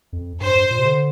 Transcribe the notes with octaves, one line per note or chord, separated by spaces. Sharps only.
F2
G2 C5
G2
A#2
C3
D3